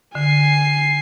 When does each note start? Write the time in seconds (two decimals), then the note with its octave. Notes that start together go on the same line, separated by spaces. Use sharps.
0.15 D3 G#5 C7